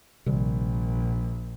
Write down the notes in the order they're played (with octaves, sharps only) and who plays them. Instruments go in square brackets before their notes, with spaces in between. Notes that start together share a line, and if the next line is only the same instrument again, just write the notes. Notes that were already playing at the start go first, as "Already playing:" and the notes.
[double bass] A#1 [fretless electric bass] C3 D#3 G3